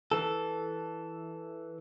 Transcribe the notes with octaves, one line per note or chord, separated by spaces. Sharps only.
E3 A4